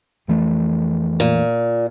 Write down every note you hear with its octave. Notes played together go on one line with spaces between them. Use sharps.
F2 E3 A3
A#2